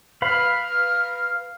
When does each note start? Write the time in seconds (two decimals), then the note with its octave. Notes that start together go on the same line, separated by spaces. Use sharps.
0.22 B4 F5 B5 F6